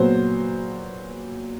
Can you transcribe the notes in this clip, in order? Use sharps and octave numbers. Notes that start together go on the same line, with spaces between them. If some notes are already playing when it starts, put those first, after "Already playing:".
Already playing: A#2 F#3 B3 C5